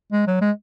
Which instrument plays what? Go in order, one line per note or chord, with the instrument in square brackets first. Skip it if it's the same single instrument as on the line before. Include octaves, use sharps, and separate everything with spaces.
[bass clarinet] G#3
F#3
G#3